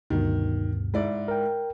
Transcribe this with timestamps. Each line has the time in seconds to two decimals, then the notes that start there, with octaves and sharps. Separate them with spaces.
0.10 D2 G2 B2 D#3
0.94 G#2 E4 D5
1.28 A#4 G5